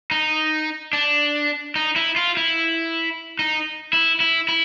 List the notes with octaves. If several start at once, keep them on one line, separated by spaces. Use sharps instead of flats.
D#4
D4
D#4
E4
F4
E4
D#4
E4
E4
E4